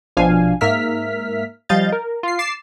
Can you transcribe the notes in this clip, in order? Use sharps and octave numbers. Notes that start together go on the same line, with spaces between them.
A#1 B2 F3 D4 F5 G#5
G#2 A#3 A#4 E5 F6 B6
F3 G3 D#5 F5 G6 A6
A#4
F4 C7
D6 A6 C7 E7